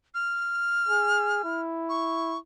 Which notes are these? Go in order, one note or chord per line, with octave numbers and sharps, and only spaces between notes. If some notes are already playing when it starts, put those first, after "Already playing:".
F6
G#4
E4
C#6